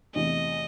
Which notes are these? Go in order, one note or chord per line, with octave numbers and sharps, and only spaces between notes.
E2 C3 E3 A3 D#5